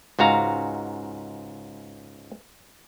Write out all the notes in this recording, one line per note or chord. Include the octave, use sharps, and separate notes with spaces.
C#2 G#2 F#4 F5 A#5